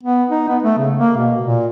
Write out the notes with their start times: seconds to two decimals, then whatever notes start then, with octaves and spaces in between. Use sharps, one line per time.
0.03 B3
0.30 D#4
0.48 B3
0.63 A3
0.78 C#3
0.97 A#3
1.17 B2
1.41 A#2